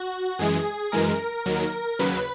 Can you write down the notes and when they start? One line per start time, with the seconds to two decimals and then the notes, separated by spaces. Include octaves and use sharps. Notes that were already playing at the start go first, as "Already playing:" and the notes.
Already playing: F#4
0.39 F#2 E3 G#3 G#4
0.92 F#2 E3 G#3 A#4
1.46 D#2 D#3 F#3
1.99 D#2 C#3 F#3 B4